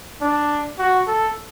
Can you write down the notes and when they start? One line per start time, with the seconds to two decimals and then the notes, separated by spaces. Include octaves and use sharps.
0.22 D4
0.79 F#4
1.07 A4